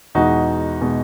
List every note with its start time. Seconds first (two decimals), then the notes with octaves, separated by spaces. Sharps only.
0.15 E2 B2 G#3 D#4 F#4
0.82 B2 G#3